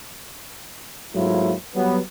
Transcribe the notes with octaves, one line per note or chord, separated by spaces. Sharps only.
G#2 F#3 A3 A#3 E4 F4
F#3 G3 B3